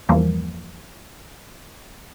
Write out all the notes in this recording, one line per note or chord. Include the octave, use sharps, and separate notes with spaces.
E2 G2 E3 F3 A#3